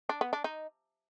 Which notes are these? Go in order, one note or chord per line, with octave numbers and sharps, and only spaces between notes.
D4
B3
D4
D#4